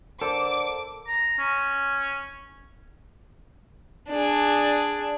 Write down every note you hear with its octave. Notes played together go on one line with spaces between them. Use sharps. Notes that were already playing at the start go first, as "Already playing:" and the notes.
D3 A4 A#4 C5 D6
A#5
C#4
D4 G#4